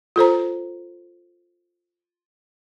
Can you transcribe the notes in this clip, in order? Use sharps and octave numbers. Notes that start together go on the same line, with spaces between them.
F4 A4 C5 A#5